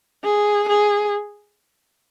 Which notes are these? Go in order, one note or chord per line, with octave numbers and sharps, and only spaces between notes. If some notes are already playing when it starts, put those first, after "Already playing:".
G#4
G#4